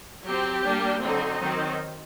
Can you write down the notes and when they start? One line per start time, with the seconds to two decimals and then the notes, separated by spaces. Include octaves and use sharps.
0.24 F#3 C4 G4
0.63 G3 A#3 D4
1.01 D3 F#3 C4 D#4
1.40 D#3 F#3 C4